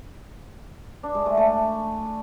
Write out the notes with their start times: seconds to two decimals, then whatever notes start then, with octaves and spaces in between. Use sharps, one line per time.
1.03 D4
1.15 G#3
1.26 A3
1.37 A3